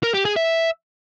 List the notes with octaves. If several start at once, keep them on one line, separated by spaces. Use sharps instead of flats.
A#4
G4
G#4
E5